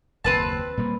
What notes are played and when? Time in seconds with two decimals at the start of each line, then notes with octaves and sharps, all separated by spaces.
0.24 F#1 D#2 C4 B4 A5
0.77 A#2 G3 A#3